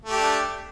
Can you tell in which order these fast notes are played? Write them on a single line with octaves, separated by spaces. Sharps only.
A3 G4 D4